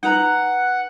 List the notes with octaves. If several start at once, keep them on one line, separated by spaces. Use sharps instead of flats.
D#4 B4 F#5 A#5